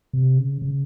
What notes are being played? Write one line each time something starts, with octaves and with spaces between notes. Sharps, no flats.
C3
C#3
C#3